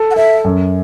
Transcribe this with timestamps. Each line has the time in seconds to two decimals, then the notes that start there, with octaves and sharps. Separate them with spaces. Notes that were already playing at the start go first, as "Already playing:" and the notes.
Already playing: A4
0.11 F#5
0.16 A4 E5
0.44 F#2